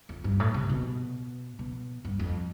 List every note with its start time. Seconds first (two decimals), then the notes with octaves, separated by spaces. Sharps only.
0.09 F2
0.24 G2
0.40 A2
0.54 C3
0.69 B2
1.59 B2
2.05 G2
2.19 F2